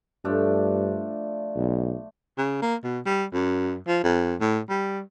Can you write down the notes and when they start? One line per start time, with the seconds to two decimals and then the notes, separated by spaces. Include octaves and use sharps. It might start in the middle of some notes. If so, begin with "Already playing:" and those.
0.25 G2 F3 A3 D4
1.56 B1
2.38 C#3
2.62 A#3
2.84 B2
3.06 G3
3.33 F#2
3.87 F3
4.03 F2
4.41 A2
4.70 G3